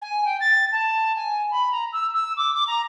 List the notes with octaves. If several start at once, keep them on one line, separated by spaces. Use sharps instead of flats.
G#5
G5
A6
A5
G#5
B5
A#5
E6
E6
D6
D6
A#5